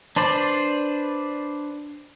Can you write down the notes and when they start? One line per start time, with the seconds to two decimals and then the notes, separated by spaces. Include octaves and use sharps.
0.16 D4 B4 C5 D5